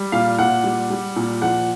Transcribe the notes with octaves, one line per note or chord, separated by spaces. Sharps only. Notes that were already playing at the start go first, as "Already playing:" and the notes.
Already playing: G3
A#2 F5
A#2 F#5
G3
G3
A#2
F3 F#5